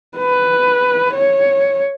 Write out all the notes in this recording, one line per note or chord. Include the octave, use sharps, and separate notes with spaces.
B4
C#5